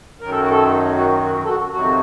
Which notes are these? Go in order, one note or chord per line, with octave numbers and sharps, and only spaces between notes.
F#2 D#3 F#3 A#4
A4
F#4
A4
F#4
F#4
A4
F#4
F2 C3 D#3 F#3 F#4